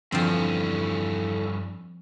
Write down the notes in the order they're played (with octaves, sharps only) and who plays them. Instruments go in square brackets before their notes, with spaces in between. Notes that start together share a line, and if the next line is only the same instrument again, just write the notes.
[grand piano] E2 D3 [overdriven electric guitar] G2 C#4 [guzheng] F3 C4 [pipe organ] E4 A4